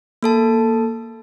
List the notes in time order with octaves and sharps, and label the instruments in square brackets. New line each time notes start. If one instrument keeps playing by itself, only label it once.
[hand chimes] A#3 A4 A5